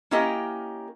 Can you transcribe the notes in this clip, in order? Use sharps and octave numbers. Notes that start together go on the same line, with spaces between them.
A#3 C#4 E4 G4 A#4 D#5